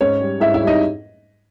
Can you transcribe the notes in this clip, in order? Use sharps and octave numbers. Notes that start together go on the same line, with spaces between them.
G#2 C#4 C#5
G3
G#2 E4 E5
E4 E5
G3
D#4 D#5